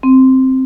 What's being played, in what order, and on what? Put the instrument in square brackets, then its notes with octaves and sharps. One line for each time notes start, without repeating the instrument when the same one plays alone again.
[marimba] C4